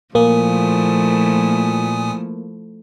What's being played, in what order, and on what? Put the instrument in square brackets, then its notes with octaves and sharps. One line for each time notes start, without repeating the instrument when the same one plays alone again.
[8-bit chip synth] A#2 G#5 D#6 [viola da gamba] F3 A3 E4 [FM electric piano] A#3